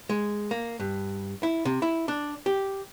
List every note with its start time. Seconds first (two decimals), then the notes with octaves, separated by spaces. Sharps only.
0.09 G#3
0.51 A#3
0.80 G2
1.43 E4
1.65 C3
1.82 E4
2.08 D4
2.46 G4